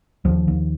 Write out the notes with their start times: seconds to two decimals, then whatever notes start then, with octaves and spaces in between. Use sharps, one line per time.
0.25 D#2 F3
0.48 D#2